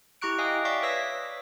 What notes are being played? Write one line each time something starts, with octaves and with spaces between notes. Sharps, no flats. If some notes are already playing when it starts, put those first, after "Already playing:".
E4 G4 A#5 C#6 F#6 D7
D#5 F5 G5 G#5 D#6
D5 E5 F5 C#6 D6
B4 C#5 D#6 E6 A#6 B6